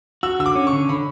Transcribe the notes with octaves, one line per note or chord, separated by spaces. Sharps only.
F#4 E6
D3 E6
D6
C#4
C#6
D3
D3 B5